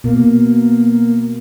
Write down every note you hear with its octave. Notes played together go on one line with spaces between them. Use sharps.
B2 A#3